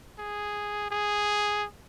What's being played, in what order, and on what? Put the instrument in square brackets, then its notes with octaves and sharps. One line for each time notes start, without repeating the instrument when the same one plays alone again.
[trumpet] G#4
G#4